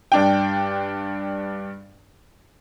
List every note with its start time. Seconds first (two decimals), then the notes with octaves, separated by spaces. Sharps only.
0.12 G2 D4 G5